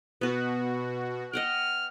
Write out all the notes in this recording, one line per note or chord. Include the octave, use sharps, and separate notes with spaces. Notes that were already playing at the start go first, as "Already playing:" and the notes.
B2 B3 F#4 B4
D#5 F#5 G5 F6